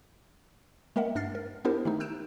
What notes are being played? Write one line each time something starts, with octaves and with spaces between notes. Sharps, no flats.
G#3 A#3 A#4 E5 F#5
G2 D4 F6 A6 C7
A#4
B3 D4 E4 G4 A#4 C5
D#3 A3 D#4
E6 F#6 G6 D7 E7